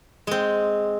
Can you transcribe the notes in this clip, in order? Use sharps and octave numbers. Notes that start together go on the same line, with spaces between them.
G#3 C4